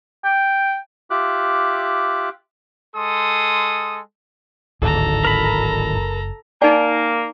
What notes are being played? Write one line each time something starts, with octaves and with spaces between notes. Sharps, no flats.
G5
F4 G4 E5 D6 F#6
G#3 A4 C6 D#6
D1 G#1 D2 A4 A#5
A#4 B5
F#1
A#3 D#4 D5 G#5